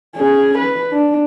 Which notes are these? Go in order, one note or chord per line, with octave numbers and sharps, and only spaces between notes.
C#4 G#4
B4
D4